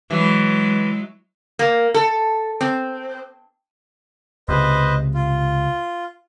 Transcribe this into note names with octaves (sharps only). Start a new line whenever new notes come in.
E3 F#3 G#3
A#3
A4
C4
C#2 C3 B4 C5 D#5
F4